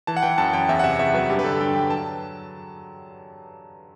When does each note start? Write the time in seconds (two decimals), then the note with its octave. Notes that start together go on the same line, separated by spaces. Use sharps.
0.07 E3 A5
0.16 F#5
0.23 E3 G5
0.38 F#2 A5
0.53 F#2 G5
0.69 E2 E5
0.79 F#5
0.83 C3 E5
0.99 E2 E5
1.14 F#3 B4
1.30 G2 G4
1.39 B4
1.44 D3 A4
1.60 G2 G5
1.75 F#3 G5
1.90 F#3 A5